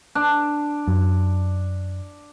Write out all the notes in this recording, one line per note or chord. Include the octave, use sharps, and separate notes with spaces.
D4
F#2